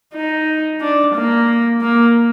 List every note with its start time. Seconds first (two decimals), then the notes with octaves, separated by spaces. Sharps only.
0.14 D#4
0.81 D4
1.15 A#3
1.81 A#3